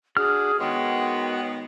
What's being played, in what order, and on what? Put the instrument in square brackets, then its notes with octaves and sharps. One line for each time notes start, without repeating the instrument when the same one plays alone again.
[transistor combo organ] D4 F#4 [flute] G#4 [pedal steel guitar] F6
[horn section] D#3 G#3 B3 [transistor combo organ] F#4 C#5 [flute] G5